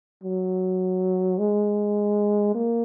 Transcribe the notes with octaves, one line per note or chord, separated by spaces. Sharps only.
F#3
G#3
A#3